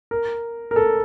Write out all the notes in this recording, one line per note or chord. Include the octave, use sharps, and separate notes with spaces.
A#4
A#4
A4